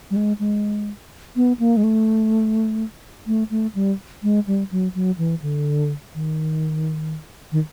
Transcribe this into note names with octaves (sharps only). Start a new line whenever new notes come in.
G3
G#3
G#3
B3
A#3
G#3
A3
A3
A3
G3
G#3
G3
F#3
F#3
E3
D3
D#3
D#3